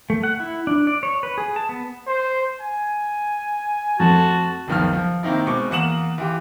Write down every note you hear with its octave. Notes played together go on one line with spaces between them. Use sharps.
A3
F#5
E4
D4
D5
C#5
B4
G#4
A5
B3
C5
G#5
F2 A3 F#4 A5
F#1 C#2 D#3 F3 B3 F6
F3
D#3 A#3 C4 D#4 E4
B2 G#3 C5 C#6 D6
E2 A#3 F#5 D#6 E7 F#7
E3 F4 G4